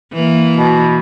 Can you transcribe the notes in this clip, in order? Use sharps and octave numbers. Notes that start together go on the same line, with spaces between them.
E3 A#3
B2